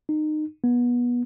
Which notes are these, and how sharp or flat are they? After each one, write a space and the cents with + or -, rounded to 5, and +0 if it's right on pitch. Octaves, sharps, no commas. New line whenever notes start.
D#4 -25
B3 -25